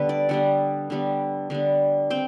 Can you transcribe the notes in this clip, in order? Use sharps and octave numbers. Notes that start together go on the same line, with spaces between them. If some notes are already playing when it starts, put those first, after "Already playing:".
Already playing: D3 G3 B3 A4 B4
D5
D3 G3 B3 F#5
D3 G3 B3
D3 G3 B3
C4 G5